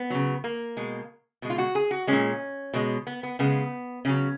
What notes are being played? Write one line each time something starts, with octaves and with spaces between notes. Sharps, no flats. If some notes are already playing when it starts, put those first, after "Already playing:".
Already playing: B3
C#3 F#3
A#3
B2 G#3
B2 G#3
F4
F#4
G#4
F#4
A#2 G#3 C#4
B2 G#3
B3
B3
C#3 G#3 B3
C#3 F#3 C#4